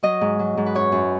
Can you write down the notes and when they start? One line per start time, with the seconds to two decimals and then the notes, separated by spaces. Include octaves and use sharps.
0.03 F#3 D#5
0.21 G#2
0.39 F#3
0.57 G#2
0.66 B4
0.75 F#2 C#5
0.92 F#2